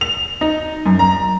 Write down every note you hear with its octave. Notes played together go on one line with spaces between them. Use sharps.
F7
D#4
F#2
A#5